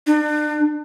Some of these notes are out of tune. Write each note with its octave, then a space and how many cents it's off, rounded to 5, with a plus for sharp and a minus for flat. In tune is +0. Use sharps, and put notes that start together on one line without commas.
D4 +40